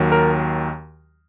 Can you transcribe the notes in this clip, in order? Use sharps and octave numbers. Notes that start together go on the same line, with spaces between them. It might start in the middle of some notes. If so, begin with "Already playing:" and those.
Already playing: D#2 D#3 F#3
A#4